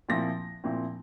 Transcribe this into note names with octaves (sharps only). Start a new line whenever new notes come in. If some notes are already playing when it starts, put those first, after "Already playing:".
A#2 F3 C4 E4 A#6
A#2 F3 C4 E4